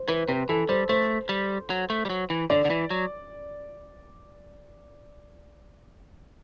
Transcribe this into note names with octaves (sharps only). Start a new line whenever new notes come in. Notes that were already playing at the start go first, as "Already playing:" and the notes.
Already playing: C5
E3 B4
C3 B4
E3 A4
G3 C5
A3 C5
G3
F#3
A3
G3
F#3
E3
D3 D5
D3
E3
F#3